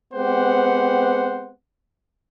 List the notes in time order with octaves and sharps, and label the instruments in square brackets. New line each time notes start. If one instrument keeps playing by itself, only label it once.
[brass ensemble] G#3 B3 C4 G4 C5 F#5